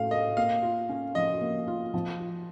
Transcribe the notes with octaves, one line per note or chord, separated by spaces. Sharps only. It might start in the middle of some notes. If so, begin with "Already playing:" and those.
Already playing: A2 A3 C#4 F5
A4 D#5
A#3 F5
F4
C#4
F3 D#5
A#3
F4
F3
F4